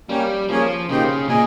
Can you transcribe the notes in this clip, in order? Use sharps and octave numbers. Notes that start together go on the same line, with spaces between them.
G3 A#3 C#4 G4
F3 A#3 C#4 G#4 C#5
C#3 A#3 D#4 G4 C5 G5
A#2 G#4 D#5 G#5